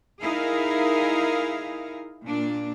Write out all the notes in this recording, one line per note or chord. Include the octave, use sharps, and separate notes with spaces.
D#4 E4 G#4 A#4 F5
A#2 A#3 D4